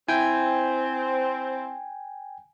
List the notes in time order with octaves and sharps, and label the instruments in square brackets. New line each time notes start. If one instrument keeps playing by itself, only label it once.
[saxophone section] C4 [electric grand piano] E4 [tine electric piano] G5 G#5